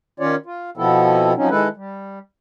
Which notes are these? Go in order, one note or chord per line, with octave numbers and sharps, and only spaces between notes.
D#3 C#4 F4 C#5 D5
F4
B2 F3 B3 C4 E4 A4
F3 F#3 C4 C#4 D#4
D#3 G#3 E4 A4 B4
G3